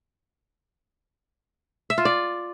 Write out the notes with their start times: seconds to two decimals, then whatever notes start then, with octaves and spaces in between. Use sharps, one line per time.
1.90 E5
1.98 F4
2.05 D5